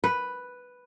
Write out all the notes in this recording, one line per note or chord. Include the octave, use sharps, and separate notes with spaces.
B4